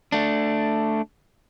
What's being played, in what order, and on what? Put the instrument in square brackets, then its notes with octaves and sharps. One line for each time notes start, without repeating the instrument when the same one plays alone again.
[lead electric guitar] A3 D4